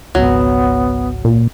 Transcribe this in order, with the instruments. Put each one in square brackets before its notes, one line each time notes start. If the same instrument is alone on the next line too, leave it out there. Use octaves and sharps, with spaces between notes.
[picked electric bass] G#1 C#2 [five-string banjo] F#3 [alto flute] B3
[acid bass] A#2